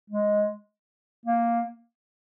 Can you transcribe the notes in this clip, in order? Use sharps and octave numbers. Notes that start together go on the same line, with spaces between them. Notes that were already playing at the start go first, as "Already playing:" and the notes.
G#3
A#3